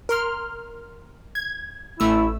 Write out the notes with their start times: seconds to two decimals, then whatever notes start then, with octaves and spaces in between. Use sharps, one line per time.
0.09 A#4 C6 F6
1.35 G#6
2.00 A1 A3 E4 E6